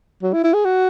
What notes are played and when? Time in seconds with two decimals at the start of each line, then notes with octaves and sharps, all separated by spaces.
0.23 F#3
0.33 E4
0.43 E4
0.54 G#4
0.65 F#4